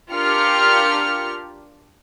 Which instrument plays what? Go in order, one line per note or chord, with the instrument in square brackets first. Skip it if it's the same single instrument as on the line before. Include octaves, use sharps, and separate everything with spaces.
[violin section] D4 F4 G4 A#4 F6 C#7